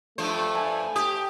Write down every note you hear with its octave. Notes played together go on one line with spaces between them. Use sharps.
G2 F3 A3 C5
G#5 A5
G4 D#6